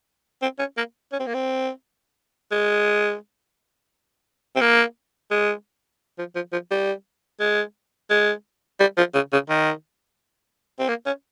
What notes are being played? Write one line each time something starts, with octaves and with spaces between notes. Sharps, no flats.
C4
C#4
A#3
C#4
C4
A#3
C4
G#3
C4
A#3
G#3
F3
F3
F3
G3
G#3
G#3
G3
F3
C#3
C#3
D#3
C4
A#3
C#4